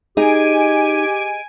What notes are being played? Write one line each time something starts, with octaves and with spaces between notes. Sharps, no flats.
D#4 G4 G#4 D#5 G#5 D7 D#7